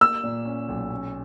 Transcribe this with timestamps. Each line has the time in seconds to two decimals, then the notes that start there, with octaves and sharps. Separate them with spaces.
0.01 A#3 E6
0.24 A#2
0.45 C#4
0.69 B1
0.90 C#4